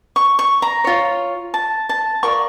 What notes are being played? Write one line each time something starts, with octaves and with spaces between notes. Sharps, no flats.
C#6
C#6
A#5
F4 C#5
A5
A5
F4 A#4 D5 C#6